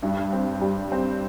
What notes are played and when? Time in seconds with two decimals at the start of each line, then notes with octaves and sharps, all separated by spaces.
0.03 G2
0.33 C4
0.61 G3
0.92 C4